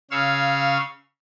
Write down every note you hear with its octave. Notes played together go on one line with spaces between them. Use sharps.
C#3 C#5 F5 E6